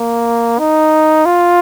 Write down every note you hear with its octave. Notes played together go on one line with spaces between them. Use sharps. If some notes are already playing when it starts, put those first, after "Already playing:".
Already playing: A#3
D#4
F4